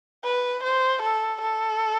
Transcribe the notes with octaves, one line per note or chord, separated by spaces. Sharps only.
B4
C5
A4
A4